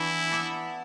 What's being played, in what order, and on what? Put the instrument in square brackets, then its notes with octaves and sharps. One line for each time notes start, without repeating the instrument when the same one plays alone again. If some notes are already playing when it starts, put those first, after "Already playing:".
Already playing: [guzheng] E3 B3 D4 [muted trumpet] E4
[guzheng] B3 D4 A4